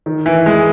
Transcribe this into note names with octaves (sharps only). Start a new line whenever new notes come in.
D#3
E3
G#3